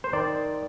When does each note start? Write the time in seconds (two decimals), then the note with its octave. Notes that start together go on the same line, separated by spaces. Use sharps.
0.04 C5
0.13 D#3 D5